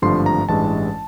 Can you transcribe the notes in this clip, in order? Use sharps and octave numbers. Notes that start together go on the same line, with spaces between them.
G#1 G2 D3 F3 A3 C6
A#5
A1 G2 E3 G#3 A5